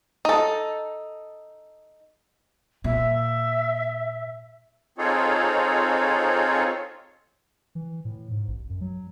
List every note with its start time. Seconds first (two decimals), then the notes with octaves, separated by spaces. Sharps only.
0.25 D#4 A4
2.84 A#2 E5
4.98 C4 D#4 F4 G#4 A4 C#5
7.75 E3
8.05 A2
8.30 G#2
8.48 A1
8.69 F#2
8.81 F#3